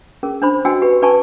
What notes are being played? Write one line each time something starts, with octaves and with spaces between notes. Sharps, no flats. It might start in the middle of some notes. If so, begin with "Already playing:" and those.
C#4 G#4 A#4
D4 C5 B5
D4 F#4 D#5 G5 G#5 E6
G4 B4
C#4 B4 D5 G#5 A5 C#6